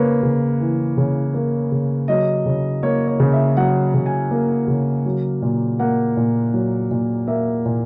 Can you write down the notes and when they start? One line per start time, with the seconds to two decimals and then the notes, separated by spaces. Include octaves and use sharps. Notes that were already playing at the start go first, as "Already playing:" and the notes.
Already playing: C#3 A#3 B4 C#5
0.23 C#3
0.60 E3
0.97 C#3
1.34 A#3
1.72 C#3
2.08 F#3 D#5
2.46 C#3
2.83 A#3 C#5
3.07 C#5
3.20 C#3
3.32 E5
3.57 F#3 F#5
3.94 C#3
4.06 G#5
4.31 A#3
4.68 C#3
5.06 F#3
5.42 A#2
5.79 A#3 F#5
6.17 A#2
6.53 F#3
6.91 A#2
7.27 A#3 E5
7.66 A#2